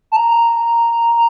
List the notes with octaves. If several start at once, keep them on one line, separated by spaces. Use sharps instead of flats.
A5
A#5